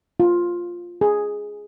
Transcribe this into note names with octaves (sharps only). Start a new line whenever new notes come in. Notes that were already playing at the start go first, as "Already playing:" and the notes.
F4
G#4